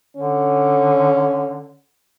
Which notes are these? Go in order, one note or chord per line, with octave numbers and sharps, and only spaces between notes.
D3 C#4